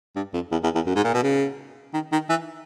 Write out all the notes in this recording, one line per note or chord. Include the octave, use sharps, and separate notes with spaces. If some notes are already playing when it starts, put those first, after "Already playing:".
G2
F2
E2
E2
E2
F#2
G#2
A#2
B2
C#3
D#3
D#3
E3